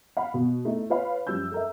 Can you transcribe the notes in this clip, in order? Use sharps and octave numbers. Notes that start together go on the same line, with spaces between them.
F5 F#5 B5
B2
A3 D#4 E4
F4 B4 C#5 F5 B5
F#2 F3 G3 E6 G6
A4 A#4 E5